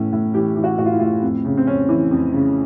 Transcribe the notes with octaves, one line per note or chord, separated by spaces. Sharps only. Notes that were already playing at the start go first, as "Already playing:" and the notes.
Already playing: A2 E3 C#4
A2
E3 G4
E3
F#4
A2 F#4
F4
E4
A2 F4
F2
C#3
C4
F2 C#4
E3
F2
C#3